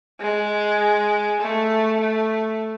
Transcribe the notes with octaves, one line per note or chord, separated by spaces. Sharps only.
G#3
A3
A3